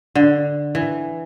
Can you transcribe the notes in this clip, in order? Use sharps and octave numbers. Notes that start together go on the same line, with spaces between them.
D3
E3